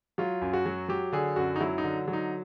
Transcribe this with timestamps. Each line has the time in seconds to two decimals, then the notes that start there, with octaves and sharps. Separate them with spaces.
0.18 F#3 F4
0.41 F#2
0.53 F#4
0.66 F#3
0.89 F#3 G4
1.13 D3 G#4
1.36 F#2 F#4
1.56 D#4
1.60 F#3 E4
1.78 D#4
1.84 D3
2.08 F#3
2.13 D#4